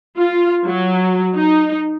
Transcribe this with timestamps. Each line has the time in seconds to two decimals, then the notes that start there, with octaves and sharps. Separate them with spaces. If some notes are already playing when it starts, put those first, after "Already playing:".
0.17 F4
0.65 F#3
1.34 D#4